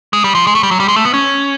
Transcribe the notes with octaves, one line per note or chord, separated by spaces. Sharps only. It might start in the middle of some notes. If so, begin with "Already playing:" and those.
G#3
G3
F3
G#3
A3
G3
F#3
G3
G#3
A3
B3
C#4